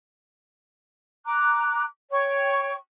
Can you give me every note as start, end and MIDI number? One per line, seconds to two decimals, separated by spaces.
1.25 1.83 82
1.25 1.83 86
1.25 1.83 90
2.11 2.74 73
2.11 2.74 79
2.11 2.74 85